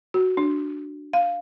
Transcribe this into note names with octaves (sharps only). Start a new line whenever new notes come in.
F#4
D4
F5